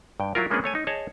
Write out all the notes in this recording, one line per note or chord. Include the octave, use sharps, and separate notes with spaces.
G2 G5
F#3 E4 F4 A#4
G#3 A#3 B3 C#4 D4 G#4
A3 C#5 G#5
D#4
G#4 C#5 D#5 A5